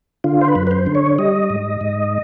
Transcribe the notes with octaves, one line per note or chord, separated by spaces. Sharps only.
D3 F4
C5
B4
F#2
B4
C5
D3
C#5
G3 D#5
G#2
G#2